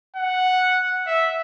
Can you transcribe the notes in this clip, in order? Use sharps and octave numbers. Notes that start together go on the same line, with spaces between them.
F#5
E5